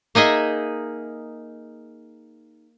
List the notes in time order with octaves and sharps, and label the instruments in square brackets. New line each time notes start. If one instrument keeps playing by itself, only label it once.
[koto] A#3 D#4 G#4 D#5 E5